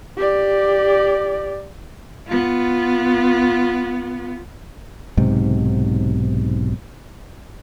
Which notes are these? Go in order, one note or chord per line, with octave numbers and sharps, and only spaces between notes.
G4 D5
B3 F4
B1 G#2 C3